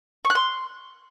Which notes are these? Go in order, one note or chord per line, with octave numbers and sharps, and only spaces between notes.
C#6
F#6
C6